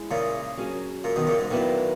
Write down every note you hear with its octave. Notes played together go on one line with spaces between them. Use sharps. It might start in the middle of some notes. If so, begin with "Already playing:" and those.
Already playing: G#3 C#4 E4 G#4
A#2 C#3
F#3 C#4 G#4
A#2
B2 D#3
A#2 C#3
G#2
A#2 D#3 F#3 B3 E4